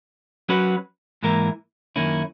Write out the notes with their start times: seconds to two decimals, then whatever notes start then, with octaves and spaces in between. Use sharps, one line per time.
0.49 F#3 C#4 F#4 B4
1.23 G#2 E3 A#3 E4 A#4
1.96 F#2 D#3 A#3 C#4 E4